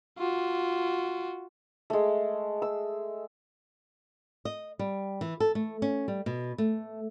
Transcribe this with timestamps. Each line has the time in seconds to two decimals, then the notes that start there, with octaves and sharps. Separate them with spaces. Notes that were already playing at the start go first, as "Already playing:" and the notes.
0.18 F4 F#4
1.90 G#3 A3
2.62 E6
4.45 D#5
4.79 G3
5.21 E3
5.40 A4
5.55 A3
5.82 C#4
6.08 G3
6.26 B2
6.58 A3